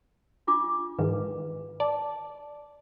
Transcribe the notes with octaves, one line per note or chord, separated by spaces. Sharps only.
D4 F4 D6
G#2 D#3 E3 B4
D5 A5